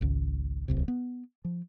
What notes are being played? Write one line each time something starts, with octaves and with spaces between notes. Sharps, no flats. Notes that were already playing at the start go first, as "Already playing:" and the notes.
G#1 C#2
D1 C2 C3
B3
F3